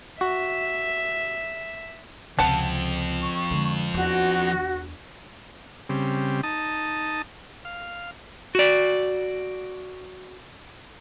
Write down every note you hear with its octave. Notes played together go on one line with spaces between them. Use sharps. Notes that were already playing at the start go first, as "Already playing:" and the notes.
F#4 E5
C#2 C3 F3 C4 F#5 A5
C#6
D3 G#3
E2 D4 F#4
C#3 G3 C4
D#4 A5 D#6
F5
F#4 D5